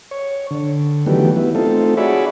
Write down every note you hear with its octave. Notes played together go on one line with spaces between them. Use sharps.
C#5
D3
D#3 E3 F#3 A3 B3 G4
B3 E4
A3 C4 D#4 F4 A4
F#4 G#4 C#5 D5 E5 B5